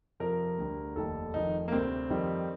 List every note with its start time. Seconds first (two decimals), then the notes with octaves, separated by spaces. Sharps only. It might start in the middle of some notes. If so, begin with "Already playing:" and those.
0.20 F2 C3 F3 A#4
0.58 D2 D3 G3
0.96 F1 D#2 D#3 G3 A4
1.34 F1 F2 D#3 D#4
1.68 A#3
1.72 D2 C3 G3 C4
2.10 F2 D#3 G3